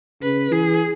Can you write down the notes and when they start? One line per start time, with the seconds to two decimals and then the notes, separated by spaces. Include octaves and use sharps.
0.22 C#3 B4
0.51 E3 G#4